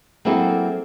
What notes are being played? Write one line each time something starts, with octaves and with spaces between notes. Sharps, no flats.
F#3 A#3 C4 E4 G#4 A4